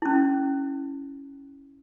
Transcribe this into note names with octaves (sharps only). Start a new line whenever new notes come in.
C#4 E4